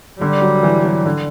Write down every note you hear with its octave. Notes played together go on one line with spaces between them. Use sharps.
D3 G3
F#3
E3
F#3
D3